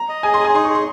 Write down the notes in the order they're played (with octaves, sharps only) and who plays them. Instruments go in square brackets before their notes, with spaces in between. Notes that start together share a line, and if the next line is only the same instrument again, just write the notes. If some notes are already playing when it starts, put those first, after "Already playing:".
Already playing: [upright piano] A#5
[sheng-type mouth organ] D#5
[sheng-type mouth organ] G#4 [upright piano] G#5
[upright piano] C6
[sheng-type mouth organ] G#4 [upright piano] G#5
[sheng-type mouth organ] D#4 [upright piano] C6
[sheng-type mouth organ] G#4 [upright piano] C#6
[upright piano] C6